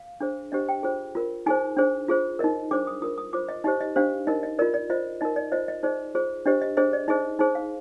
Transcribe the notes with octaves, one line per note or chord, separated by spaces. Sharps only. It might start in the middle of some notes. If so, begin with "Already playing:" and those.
Already playing: F5
D4 G#4 C5
D4 G4 C5 D#5
G5
F4 G#4 C5
F4 A#4
D#4 G#4 C5 G#5
D4 G#4 C5
F4 G#4 C5
D#4 A#4 D#5
D4 G#4 C5 D6
D#6
F4 A#4 D#6
D#6
F4 C5 D6
D#5
D#4 G4 C5 D#5
D#5
D4 G4 C5 F5
D#4 A#4 D#5
D#5
F4 A#4 D5
D5
F4 C5 D#5
D#4 A#4 D#5
D5
F4 C5 D#5
D#5
D#4 G#4 C5 D5
F4 G#4 C5
D4 G4 C5 D#5
D#5
D4 G#4 C5 D#5
D5
D#4 G#4 C5 D#5
D#4 G#4 C5
F5